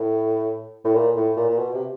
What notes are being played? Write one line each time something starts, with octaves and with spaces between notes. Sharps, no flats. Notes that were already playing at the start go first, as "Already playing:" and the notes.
Already playing: A2
A2
A#2
A2
A#2
A#2
B2
C3